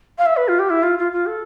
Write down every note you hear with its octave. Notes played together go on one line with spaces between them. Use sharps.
F5
E5
B4
F4
G4
E4
F4
F4
F4
A4